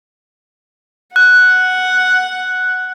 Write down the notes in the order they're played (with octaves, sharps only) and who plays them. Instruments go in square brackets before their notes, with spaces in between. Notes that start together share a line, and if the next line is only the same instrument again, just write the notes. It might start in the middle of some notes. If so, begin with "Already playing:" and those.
[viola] F#5 [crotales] F#6